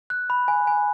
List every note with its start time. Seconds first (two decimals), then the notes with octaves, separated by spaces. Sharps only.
0.10 F#6
0.30 B5
0.48 G#5
0.67 G#5